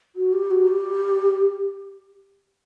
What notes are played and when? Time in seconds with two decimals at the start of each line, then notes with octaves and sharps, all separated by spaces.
0.16 F#4
0.33 G4
0.51 F#4
0.67 G4